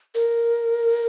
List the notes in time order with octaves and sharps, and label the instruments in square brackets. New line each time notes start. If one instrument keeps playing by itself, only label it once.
[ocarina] A#4